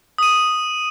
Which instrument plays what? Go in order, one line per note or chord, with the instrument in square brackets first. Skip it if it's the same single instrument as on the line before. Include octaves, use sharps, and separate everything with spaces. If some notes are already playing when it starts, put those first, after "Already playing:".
[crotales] D#6 D#7